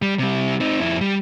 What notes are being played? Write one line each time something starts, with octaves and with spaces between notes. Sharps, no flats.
G3
C3 G3
C4 D#4
F2 E4
G3